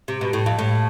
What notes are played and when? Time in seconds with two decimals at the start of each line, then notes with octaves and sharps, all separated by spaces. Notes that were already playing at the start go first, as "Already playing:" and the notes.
0.08 C3
0.21 B2
0.33 A2
0.46 F2
0.59 A2